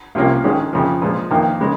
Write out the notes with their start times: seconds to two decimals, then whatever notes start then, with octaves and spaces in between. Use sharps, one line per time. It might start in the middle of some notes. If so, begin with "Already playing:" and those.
0.15 C2 C3 F3 A#3 C#4
0.44 G#2 D#3 G#3 C#4
0.73 F2 C#3 F3
1.02 A#2 F3 G#3
1.31 F2 D#3 A#3 D#4
1.61 C#3 G#3 D#4